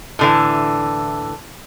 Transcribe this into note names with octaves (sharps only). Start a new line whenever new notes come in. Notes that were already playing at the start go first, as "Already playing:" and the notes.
A2 D3 E3